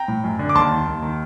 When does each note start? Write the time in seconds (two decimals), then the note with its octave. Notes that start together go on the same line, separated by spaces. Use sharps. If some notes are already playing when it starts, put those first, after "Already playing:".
Already playing: G5 A#5
0.08 A2
0.24 F#2
0.39 D3
0.49 D6
0.55 D#2 A5 C6
0.71 D#3
0.87 D#2
1.03 D#3